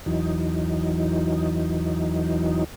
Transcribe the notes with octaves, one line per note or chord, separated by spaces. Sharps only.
E2 E3 F#3 D#4